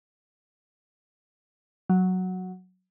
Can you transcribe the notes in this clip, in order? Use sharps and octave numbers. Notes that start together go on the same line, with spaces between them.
F#3